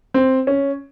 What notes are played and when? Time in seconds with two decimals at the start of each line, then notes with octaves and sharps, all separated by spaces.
0.14 C4
0.47 C#4